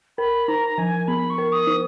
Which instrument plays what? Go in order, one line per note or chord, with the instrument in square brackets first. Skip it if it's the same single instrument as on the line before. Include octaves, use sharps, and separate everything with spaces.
[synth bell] A#4 [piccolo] B5
[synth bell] D#4 [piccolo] A#5
[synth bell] F3 [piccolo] G#5
[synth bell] B3 [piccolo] B5
[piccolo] C#6
[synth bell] A#4
[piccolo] D#6
[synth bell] D#4